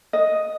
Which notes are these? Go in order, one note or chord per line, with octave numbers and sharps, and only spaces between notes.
D#5